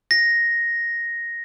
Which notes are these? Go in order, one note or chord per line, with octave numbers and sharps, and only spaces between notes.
A#6